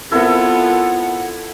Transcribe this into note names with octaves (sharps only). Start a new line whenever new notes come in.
B3 C4 E4 F4 A4 A#4 F#5